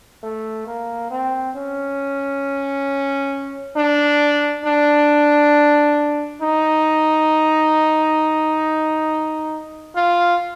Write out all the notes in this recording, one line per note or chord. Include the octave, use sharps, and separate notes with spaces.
A3
A#3
C4
C#4
D4
D4
D#4
F4